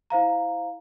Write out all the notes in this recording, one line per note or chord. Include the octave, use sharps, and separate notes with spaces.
E4 C5 F5 A#5